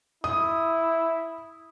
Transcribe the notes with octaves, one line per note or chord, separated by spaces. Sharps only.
E4 D#6